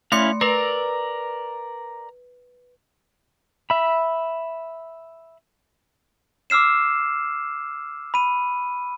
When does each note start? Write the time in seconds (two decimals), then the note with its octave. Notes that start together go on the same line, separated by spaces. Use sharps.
0.12 A3 C#4 E4 F5 C6 C#7
0.41 A#4 B4 D5 A#5
3.70 E5 B5
6.50 D6 E6 F6 C7 E7
8.14 B5 D#7